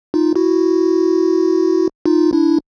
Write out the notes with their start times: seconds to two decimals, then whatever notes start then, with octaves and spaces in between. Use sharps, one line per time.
0.14 D#4 F4
0.36 E4 F#4
2.06 D#4 F4
2.33 D4 E4